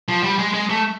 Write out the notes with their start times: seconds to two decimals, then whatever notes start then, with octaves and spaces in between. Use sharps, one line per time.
0.09 F3
0.23 G3
0.39 G#3
0.54 G#3
0.70 A3